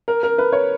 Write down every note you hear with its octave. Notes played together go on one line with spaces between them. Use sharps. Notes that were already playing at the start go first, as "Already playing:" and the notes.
A#4
A#4
B4
C#5